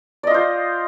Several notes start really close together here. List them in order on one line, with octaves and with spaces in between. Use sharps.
D5 D#5 F4 C5